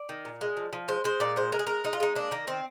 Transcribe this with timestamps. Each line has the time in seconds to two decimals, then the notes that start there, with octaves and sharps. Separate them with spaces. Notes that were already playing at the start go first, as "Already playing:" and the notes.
Already playing: D5
0.09 D#3
0.25 A#2
0.41 G#3
0.57 F3
0.73 F3
0.88 G#3 C5
1.04 G#3 C5
1.20 A#2 D5
1.36 G#3 C5
1.52 G#3 A#4
1.59 G#4
1.67 G#3 A#4
1.84 G#3 D#4
1.93 F4
2.00 G#3 D#4
2.15 A#3 D4
2.31 D#3 A#3
2.47 D#3 C4